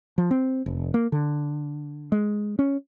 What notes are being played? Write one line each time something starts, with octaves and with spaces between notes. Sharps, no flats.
F3
C4
F1
A#3
D3
G#3
C#4